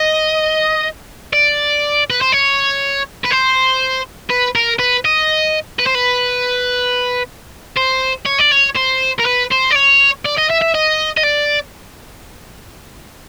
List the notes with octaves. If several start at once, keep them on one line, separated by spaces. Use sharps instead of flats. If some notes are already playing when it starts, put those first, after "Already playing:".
Already playing: D#5
D5
B4
C5
C#5
B4
C5
B4
A#4
B4
D#5
B4
C5
B4
C5
C#5
D5
C#5
C5
A#4
B4
C5
D5
C#5
D5
D#5
E5
E5
D#5
D#5
D5